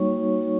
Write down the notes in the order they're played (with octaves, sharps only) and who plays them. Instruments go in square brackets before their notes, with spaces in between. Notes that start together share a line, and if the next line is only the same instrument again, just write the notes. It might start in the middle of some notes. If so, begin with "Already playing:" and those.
Already playing: [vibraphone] G3 A#3 D#4 F#4 C#5 C#6